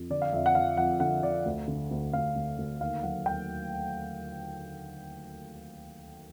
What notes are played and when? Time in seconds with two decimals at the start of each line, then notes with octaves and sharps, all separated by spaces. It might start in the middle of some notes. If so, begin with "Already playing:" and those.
Already playing: F2
0.10 D3 D5
0.22 F5
0.33 F2 E5
0.46 F#5
0.55 F3 F5
0.77 F2 F#5
1.00 D3 F#5
1.23 D3 D5
1.46 D2
1.68 D3
1.91 D2
2.13 D2 F5
2.36 D2
2.58 D2
2.81 D#2 F5
3.03 F#3 F#5
3.26 D#2 G5